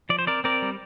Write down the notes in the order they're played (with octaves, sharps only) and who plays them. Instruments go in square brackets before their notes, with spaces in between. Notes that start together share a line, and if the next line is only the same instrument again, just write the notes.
[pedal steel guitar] F3 D5
C5
C4 A#4 D5
C4 A#4 D5
G3